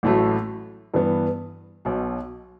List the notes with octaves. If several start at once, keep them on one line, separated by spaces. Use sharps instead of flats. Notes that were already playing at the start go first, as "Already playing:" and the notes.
A1 A2 F#3 A3
G2 E3 B3
B1 B2 F#3